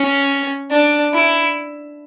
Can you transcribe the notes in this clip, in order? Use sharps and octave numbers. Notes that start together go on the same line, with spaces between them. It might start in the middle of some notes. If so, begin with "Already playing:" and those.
Already playing: C#4
D4
E4